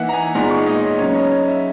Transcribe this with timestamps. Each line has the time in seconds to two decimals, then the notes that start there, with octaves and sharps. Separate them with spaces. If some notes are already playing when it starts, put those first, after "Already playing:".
Already playing: E3 A#3 D#4 E5 F#5
0.09 A#5
0.13 G#5
0.35 A#2 G#3 B3 D#4 A#5
0.51 C#6
0.67 D#5
0.83 C#5
0.99 C#3 F#3 C#4 C#5
1.15 D#5
1.31 C#5
1.47 E5